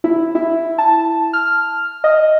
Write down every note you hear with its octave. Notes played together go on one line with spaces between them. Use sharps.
E4
E4
A5
F6
D#5